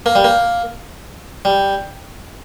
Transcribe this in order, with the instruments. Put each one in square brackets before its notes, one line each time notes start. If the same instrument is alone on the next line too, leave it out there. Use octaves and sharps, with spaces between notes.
[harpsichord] A#3
G3
A#3
G3